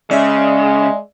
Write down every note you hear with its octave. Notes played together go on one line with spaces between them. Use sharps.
C#3 G#3 D5 E5